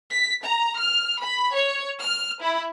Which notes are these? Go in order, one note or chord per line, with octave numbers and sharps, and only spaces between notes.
B6
A#5
F6
B5
C#5
F6
E4